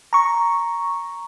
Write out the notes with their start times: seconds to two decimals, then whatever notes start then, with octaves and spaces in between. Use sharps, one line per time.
0.13 A#5 C#6